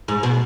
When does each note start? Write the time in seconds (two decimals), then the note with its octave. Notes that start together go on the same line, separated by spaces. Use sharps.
0.08 G#2
0.23 B2